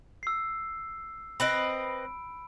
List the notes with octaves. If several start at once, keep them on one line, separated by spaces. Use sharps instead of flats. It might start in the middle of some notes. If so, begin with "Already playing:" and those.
E6 C7
C4 B4 D#5 B5 E6 D7